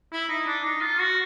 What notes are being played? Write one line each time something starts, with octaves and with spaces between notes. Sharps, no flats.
E4
D#4
D4
D#4
F4
F#4